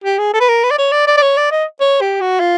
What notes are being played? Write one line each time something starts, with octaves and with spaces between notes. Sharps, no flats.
G4
G#4
A4
B4
A#4
B4
D5
C#5
D5
D5
D5
C#5
D5
D#5
C#5
G4
F#4
F4